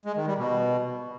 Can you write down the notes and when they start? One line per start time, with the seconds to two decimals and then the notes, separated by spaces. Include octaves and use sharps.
0.05 G#3
0.16 D#3
0.27 G3
0.38 B2